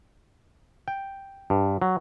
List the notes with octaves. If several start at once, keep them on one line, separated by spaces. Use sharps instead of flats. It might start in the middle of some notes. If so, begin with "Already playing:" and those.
G5
G2
F#3